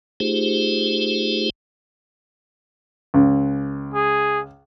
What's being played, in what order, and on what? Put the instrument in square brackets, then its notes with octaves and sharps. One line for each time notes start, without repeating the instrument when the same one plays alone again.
[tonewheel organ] A3 D#4 F4 G4 G#4 C5
[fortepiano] C#2
[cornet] G#4